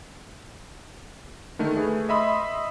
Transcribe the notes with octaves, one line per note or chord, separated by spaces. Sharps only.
D3 D#3 A3
A3 G#4 B4
D#5 E5 B5 C6 D#6